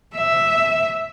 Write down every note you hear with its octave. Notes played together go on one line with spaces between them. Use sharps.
E5